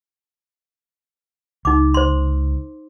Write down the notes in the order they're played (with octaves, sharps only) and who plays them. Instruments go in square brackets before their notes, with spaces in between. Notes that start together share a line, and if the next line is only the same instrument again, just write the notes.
[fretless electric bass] C#2 [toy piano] D#4 D6
[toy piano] C5 C6